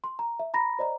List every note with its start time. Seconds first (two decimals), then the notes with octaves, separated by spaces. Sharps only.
0.04 C6
0.19 A#5
0.39 E5
0.54 A#5 B5 A#6
0.79 C5 D5 D#5 A#5